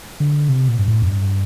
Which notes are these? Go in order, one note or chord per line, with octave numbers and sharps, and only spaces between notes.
D3
C3
A#2
G2
A2
F2
G2